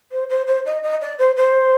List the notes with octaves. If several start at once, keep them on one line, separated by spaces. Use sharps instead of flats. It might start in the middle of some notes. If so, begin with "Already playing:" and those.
C5
C5
C5
D#5
D#5
D5
C5
C5